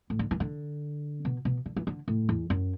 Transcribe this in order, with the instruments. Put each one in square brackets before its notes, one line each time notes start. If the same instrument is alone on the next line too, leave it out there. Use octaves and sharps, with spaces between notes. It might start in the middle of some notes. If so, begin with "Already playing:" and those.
[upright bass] A2
D3
E3
D3
B2
B2
D3
E3
D3
A2
E2
F#2